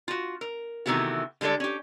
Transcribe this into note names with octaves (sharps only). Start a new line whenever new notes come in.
F4 F#4
A#4
C3 D#3 E3 A3 B3 F#4
D3 G3 G#3 A4 D5
C#4 G4